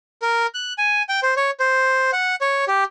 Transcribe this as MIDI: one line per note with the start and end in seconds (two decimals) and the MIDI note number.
0.22 0.46 70
0.54 0.73 90
0.78 1.03 80
1.09 1.20 79
1.23 1.34 72
1.37 1.51 73
1.60 2.11 72
2.13 2.35 78
2.41 2.65 73
2.68 2.84 67